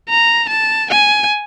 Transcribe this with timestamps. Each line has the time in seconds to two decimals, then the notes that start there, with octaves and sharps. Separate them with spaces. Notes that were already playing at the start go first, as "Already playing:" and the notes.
0.09 A#5
0.49 A5
0.90 G#5